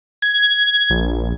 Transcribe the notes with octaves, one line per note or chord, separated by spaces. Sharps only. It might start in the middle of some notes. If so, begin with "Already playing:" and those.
G#6
A#1